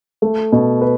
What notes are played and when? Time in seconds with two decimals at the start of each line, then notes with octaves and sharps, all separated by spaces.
0.22 A3
0.52 B2
0.81 B4